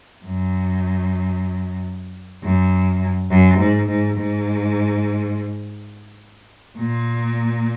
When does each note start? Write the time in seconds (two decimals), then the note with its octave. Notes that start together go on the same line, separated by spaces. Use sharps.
0.25 F#2
2.43 F#2
3.30 F#2
3.59 G#2
3.89 G#2
4.17 G#2
6.78 A#2